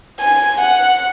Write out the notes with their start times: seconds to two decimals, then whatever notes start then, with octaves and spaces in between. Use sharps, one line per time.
0.19 G#5
0.61 F#5